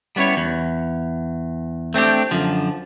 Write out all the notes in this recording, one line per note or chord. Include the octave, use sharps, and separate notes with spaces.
G3 B3 C#4 E4 C#5
E2
A3 C4 D4 G4
F#2 D3 F3